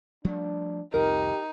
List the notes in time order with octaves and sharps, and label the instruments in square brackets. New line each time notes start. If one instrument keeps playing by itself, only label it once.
[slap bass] F3 G3 A3 [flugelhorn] D4
[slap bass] C2 F2 F3 [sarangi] D#4 [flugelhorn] G4 [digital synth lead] A#4